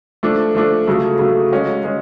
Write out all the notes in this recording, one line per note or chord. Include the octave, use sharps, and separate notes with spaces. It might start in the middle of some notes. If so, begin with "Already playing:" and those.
F3 A3 D4
F3 A3 D4
C#3 F#3 A3
C#3 F#3 A3
G#3 C#4 F#4
G#3 C#4